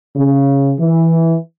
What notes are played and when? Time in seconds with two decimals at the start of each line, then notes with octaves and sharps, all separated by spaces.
0.16 C#3
0.79 E3